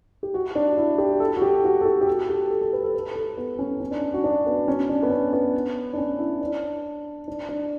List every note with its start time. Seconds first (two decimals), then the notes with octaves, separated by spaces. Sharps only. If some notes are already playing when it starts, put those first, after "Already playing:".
0.23 G4
0.34 F#4
0.55 D4
0.78 E4
0.98 G4
1.20 A4
1.37 F#4
1.42 G4
1.64 F#4
1.81 A4
1.85 G4
2.01 G4
2.07 A4
2.29 G4
2.50 A4
2.62 A4
2.73 B4
2.83 A4
2.94 B4
3.16 A4
3.37 B3
3.59 C#4
3.80 C#4
3.91 D4
4.14 F#4
4.24 D4
4.46 B3
4.68 C#4
4.89 D4
5.03 B3
5.10 C#4
5.33 B3
5.93 D4
5.98 C#4
6.19 E4
6.41 D4
7.28 D4
7.49 D4